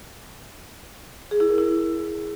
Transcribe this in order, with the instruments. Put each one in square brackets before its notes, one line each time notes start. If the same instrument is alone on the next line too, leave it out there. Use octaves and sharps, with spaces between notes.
[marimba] G#4
E4
A#4
E4